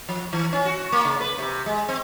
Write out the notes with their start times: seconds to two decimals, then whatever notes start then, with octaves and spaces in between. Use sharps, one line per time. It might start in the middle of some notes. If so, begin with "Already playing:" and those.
0.09 F3
0.33 E3
0.53 C#4
0.66 F#4
0.92 A#3
1.05 C#3
1.21 B4
1.38 C3
1.66 G#3
1.89 C4